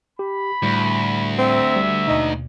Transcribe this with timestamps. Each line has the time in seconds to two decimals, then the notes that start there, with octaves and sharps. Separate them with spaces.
0.19 G4 B5
0.62 D2 A2 G3
1.38 C4 E5
1.76 G3
2.08 D#2 B2 D#4